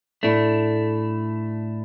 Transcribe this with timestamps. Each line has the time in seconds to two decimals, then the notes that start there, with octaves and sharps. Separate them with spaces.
0.23 A2 A3 D4